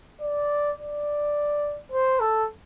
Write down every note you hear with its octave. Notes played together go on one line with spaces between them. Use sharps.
D5
D5
C5
A4